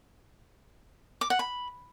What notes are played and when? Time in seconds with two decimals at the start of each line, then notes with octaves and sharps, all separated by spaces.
1.21 D6
1.30 F#5
1.39 B5